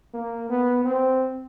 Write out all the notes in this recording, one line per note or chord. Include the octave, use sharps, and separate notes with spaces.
A#3
B3
C4